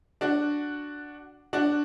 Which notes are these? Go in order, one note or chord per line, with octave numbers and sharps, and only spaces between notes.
D4 F#4
D4 F#4